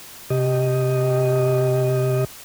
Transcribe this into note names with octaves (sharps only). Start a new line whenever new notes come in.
C3 G4 D#5